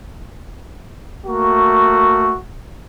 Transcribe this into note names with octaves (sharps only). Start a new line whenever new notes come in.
A3 A#3 F#4